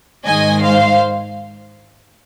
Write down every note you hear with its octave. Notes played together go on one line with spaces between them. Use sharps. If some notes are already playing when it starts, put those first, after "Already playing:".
G#2 D#3 G#3 D#5 G#5
C5 F5